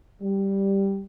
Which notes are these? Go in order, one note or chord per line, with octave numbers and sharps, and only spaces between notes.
G3